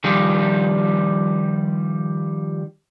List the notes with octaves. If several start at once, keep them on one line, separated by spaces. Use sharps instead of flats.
D#3 F3 G3 F4